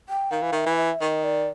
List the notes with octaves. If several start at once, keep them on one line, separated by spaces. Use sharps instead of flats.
G5
D#3 F5
E3
D#3 E5
E3
E5
D#3 D#5
D5